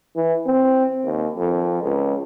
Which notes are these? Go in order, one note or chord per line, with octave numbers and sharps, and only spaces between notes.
E3
C4
D#2
F2
C#2